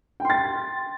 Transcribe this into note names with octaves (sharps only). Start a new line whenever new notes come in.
G5 C6 A6